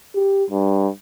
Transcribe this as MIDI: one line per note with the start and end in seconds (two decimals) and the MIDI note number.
0.15 0.44 67
0.50 0.88 43